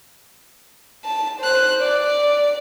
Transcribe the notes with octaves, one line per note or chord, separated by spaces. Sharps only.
A5
C5 F#6
D5